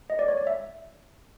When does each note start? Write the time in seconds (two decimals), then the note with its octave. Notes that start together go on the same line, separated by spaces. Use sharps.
0.10 D#5
0.19 D5
0.28 C#5
0.38 D5
0.47 E5